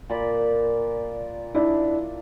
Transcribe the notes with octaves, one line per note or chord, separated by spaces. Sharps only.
A#2 D5 B5
D4 E4